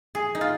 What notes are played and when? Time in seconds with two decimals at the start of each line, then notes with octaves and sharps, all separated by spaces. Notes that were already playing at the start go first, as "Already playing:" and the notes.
0.15 G#4
0.35 D#4
0.41 F4